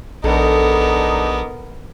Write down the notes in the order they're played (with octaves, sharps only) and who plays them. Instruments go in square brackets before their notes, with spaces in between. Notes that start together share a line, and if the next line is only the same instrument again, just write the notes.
[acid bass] A#1 [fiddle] B3 A#4 [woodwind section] D4 D#4 [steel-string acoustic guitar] A4